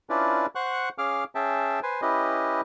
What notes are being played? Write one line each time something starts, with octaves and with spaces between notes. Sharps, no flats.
C#4 D4 E4 F4 B4 D5
C5 F#5 C#6 F#6
C#4 G#4 F5 D6 F6
C#4 G#4 E5 G5 A5
B4 C5 G#5
C#4 E4 G4 B4 D#5